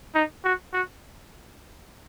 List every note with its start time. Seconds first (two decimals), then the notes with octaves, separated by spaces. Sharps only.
0.15 D#4
0.44 F#4
0.73 F#4